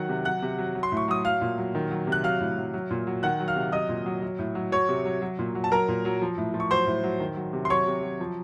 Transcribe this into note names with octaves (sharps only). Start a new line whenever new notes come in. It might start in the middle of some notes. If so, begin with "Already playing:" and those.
Already playing: D#3 F#3 F#5 F#6
C3
F#3 F#5 F#6
C3
F#3
F#3
C6
A2 C#6
F#3 D#6
F#3 F5 F6
A#2
F#3
D#3
F#3
C3
F#6
F#3 F5 F6
A2
F#3
F#3
A#2
F#3
D#3 F#5 F#6
F#3
F5 F6
C3
F#3 D#5 D#6
A#2
F#3
F#3
A2
F#3
F#3 C#5 C#6
C3
F#3
F#3
A#2
F#3
A5
F#3 A#4 A#5
A#2
F#3
F3
A2
F3
C#6
F#3 C5 C6
A2
F#3
D#3
F#3
C3
C6
F#3 C#5 C#6
C3
F#3
F3